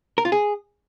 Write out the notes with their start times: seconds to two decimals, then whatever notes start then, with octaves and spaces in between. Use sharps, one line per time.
0.18 A#4
0.25 F4
0.32 G#4